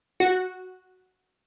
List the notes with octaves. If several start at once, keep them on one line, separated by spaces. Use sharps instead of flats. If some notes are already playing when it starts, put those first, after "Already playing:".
F#4